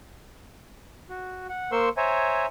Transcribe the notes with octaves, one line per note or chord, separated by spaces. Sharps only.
F#4
F#5
A#3 A#4 C5 C6 C#6 E6
C5 C#5 E5 G#5 A#5